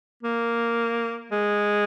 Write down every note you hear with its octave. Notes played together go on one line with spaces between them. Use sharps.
A#3
G#3